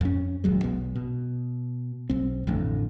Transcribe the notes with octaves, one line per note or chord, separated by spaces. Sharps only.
F2 C#4
D#1 F#3 G#3
B1 B3
B2
B1 C4
A1 F2 A2 D3